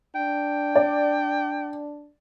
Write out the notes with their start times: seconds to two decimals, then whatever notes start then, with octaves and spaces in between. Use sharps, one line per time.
0.15 D4 G5
0.76 D5